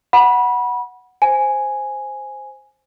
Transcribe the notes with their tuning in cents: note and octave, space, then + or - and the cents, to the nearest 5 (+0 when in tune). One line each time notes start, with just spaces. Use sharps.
F#5 +0 B5 -25
C5 +0 G#5 +0